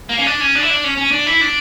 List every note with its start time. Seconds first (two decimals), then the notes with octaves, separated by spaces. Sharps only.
0.09 A#3
0.18 C#4
0.26 D4
0.40 C#4
0.55 D4
0.62 E4
0.70 D4
0.84 C#4
0.97 C#4
1.12 D4
1.26 E4
1.41 D4